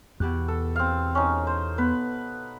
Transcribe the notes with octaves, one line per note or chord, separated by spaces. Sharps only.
E2 B2 G4 F#6
A4
C4 F5
C#4 D#4
C5
B3 B4